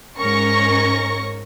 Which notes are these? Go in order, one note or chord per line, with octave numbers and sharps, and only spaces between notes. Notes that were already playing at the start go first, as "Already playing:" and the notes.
G#2 C#4 A#4 C#6 A#6 C#7